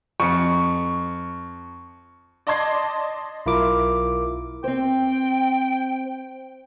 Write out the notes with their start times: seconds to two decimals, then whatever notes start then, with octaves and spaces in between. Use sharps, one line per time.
0.20 F2 C#6 C#7
2.47 D5 D#5 A5 C6 G#6 C7
3.46 B1 E4 F4 A#4 D6
4.64 C4 C5 G5